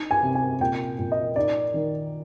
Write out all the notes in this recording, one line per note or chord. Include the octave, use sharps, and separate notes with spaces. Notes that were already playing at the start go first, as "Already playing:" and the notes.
Already playing: D#4
G#5
C3
G#5
A#2 G5
A#2
D#5
D#4 D5
D#3